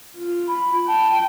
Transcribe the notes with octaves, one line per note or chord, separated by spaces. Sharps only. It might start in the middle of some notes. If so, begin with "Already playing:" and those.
F4
B5
G5 A5